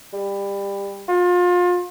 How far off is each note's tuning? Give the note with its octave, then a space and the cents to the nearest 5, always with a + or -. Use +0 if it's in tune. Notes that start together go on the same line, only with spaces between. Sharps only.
G3 +25
F4 +30